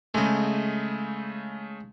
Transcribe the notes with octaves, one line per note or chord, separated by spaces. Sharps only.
C#3 G#3 A3 D#5